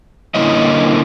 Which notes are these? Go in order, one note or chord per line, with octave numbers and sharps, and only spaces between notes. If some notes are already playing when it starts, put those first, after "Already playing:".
D3 G3 A#3 C#4 E4 D#5